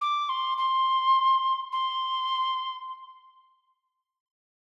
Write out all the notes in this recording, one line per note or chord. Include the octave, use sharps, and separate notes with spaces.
D6
C6
C6
C6